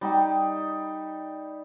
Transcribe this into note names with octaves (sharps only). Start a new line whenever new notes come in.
G3 D#4 G5